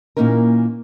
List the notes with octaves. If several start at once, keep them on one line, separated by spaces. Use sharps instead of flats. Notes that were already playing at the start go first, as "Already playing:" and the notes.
A#2 E3 A#3 C#4 D#4 A#4